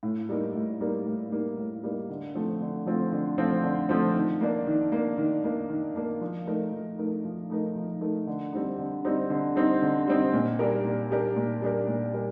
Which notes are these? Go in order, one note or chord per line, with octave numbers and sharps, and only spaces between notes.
A2
G3 A#3 D#4 A#4
A2
G3 A#3 D#4 A#4
A2
G3 A#3 D#4 A#4
A2
G3 A#3 D#4 A#4
D3
F3 A3 C4 F4
D3
F3 A3 C4 F4
D3
F3 A3 C4 F4
D3
F3 A3 C4 F4
D#3
A#3 D4
D#3
A#3 D4
D#3
A#3 D4
D#3
A#3 D4
F3
A3 D#4 A#4
F3
A3 D#4 A#4
F3
A3 D#4 A#4
F3
A3 D#4 A#4
D3
G3 C4 D#4
D3
G3 C4 D#4
D3
G3 C4 D#4
D3
G3 C4 D#4
A#2
G3 D4 G4 A#4
A#2
G3 D4 G4 A#4
A#2
G3 D4 G4 A#4
A#2
G3 D4 G4 A#4